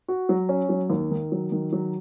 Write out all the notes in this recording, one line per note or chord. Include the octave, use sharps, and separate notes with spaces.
F#4
F#3
C#4
F#3
D#2
D#3
F#3
D#3
F#3